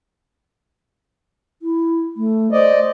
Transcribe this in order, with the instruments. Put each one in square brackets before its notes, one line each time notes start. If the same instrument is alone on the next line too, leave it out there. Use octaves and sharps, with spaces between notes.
[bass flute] E4
A3
[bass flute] C5 [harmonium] D5 D#5